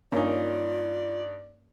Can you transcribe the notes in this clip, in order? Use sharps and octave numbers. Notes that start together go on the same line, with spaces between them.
G2 A#3 C#4 D#4 F4 D5